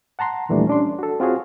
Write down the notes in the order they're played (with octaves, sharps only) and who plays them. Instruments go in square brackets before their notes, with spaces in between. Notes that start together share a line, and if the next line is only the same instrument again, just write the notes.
[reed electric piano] F#5 A5 A#5 C6
D#2 A#2 E3 G3 A3 D4
C#4 D4 C6
F#4 A4
C4 F4 F#4 G#4 C#5